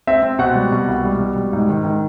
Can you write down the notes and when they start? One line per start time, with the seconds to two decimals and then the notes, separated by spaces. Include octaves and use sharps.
0.07 C4 E5
0.23 C4
0.39 B2 F#5
0.55 G3
0.72 B2
0.88 C2
1.04 G3
1.20 B2
1.36 G3
1.53 G#2
1.69 D#3
1.85 D#3